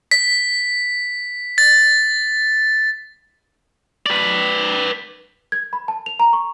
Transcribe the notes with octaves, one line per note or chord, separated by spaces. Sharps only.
B6
A6
B4 D5
G#6
B5
A5
F7
A#5
C#6